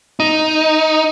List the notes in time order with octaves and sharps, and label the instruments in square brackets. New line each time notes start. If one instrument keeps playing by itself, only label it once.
[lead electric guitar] D#4